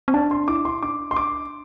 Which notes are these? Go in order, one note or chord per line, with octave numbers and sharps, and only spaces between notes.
C4
D4 A5
C6
E4 D6
C6
D4 D6
C6
D6